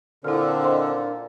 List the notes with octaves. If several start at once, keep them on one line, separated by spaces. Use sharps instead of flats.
A#2 D3 C4 E4 F6
C5 D#5 C6